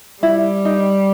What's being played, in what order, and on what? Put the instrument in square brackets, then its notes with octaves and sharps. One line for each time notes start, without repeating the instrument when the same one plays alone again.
[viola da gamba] G3 [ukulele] E4
[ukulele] D#4